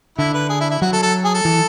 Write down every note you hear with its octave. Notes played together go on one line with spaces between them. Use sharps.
D3 E4
B4
G#4
E4
E4
F#3 F#4
A4
A4
G#4
A4
E3